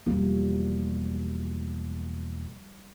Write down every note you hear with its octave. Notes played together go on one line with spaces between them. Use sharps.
E1 E2 F3 G3 A#3